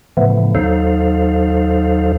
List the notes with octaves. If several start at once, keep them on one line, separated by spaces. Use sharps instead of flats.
A2 C#3 E3 F3 A3 B3
D#2 F#3 D#4 A4 C5 F5